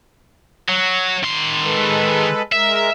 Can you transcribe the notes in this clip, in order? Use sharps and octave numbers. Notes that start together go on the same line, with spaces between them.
F#3
D#3 C6
G#3 A4 B4
G#3 A#4 E5